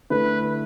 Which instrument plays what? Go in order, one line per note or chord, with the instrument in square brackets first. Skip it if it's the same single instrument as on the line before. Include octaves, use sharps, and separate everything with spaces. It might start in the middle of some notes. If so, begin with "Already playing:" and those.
[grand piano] D3 A3 E4 [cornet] B4